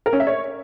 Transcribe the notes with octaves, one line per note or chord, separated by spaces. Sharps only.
A#4
C#4
E5
C#5